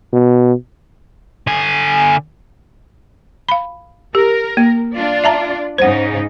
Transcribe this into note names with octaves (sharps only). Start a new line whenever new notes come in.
B2
D3 G#5
F5 B5
G4 A#4
A#3
D4 F4 D5
E5 A5 A#5
G#2 C#3 D#4 C5 F#5